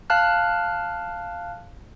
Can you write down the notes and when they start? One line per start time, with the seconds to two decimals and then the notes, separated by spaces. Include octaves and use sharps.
0.10 F5 A5 F6 F#6